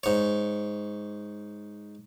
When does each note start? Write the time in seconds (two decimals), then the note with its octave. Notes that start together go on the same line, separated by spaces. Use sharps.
0.03 G#2 C#5